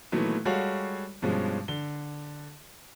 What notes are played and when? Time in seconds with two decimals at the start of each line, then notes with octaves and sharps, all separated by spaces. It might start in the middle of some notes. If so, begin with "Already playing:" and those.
0.12 A#2 D#3 E3 F#3 A3 B3
0.45 G3 G#3 F#4 A4 C#5 F5
1.22 G2 B2 F3 G#3 C#4
1.68 D3 G7